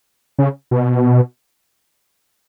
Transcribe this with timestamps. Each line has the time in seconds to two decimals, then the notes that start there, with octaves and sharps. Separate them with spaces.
0.38 C#3
0.71 B2